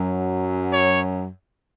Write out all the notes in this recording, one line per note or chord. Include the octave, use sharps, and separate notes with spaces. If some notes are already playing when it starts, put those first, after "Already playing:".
Already playing: F#2 F#3
C#5